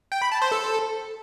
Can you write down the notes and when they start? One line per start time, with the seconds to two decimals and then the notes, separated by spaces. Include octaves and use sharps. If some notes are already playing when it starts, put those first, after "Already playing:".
0.12 G5
0.22 B5
0.32 A5
0.42 C5
0.52 A4